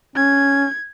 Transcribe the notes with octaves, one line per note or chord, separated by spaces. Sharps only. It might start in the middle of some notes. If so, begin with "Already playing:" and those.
C#4 G#6